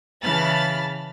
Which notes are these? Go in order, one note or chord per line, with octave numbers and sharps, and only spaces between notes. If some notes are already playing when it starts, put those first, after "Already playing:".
C#3 E3 A5 B5 F6 A6